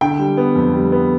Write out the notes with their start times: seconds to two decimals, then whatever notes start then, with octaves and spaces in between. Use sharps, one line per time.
0.01 D3 G5
0.19 G3
0.37 B3
0.56 F2
0.73 G3
0.92 B3